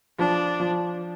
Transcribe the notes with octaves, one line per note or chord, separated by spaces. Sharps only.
F3 D4
F3